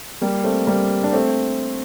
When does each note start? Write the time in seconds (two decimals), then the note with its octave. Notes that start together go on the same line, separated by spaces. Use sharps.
0.21 G3 A#3
0.44 A3 C4
0.67 G3 A#3
1.04 D4
1.13 A3 C4